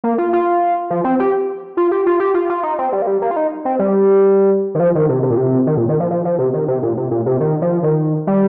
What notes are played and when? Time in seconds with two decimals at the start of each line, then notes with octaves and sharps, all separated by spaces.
0.04 A#3
0.18 F4
0.33 F4
0.90 F3
1.04 C4
1.20 G4
1.77 F4
1.91 G4
2.07 F4
2.20 G4
2.34 F4
2.50 F4
2.63 D#4
2.78 C4
2.92 G3
3.02 A#3
3.07 G3
3.22 A#3
3.31 F4
3.36 D#4
3.65 C4
3.79 G3
4.75 D#3
4.80 F3
4.95 D#3
5.09 C3
5.23 C3
5.30 A#2
5.38 C3
5.67 D#3
5.77 A#2
5.89 D#3
6.00 F3
6.11 F3
6.25 F3
6.38 C3
6.54 D#3
6.68 C3
6.83 A#2
6.97 C3
7.11 A#2
7.26 C3
7.40 D#3
7.62 F3
7.83 D#3
8.27 G3